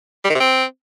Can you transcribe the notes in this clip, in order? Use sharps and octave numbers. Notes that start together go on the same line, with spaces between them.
G3
D#3
C3
C4